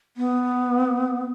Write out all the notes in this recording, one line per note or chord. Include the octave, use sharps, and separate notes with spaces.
B3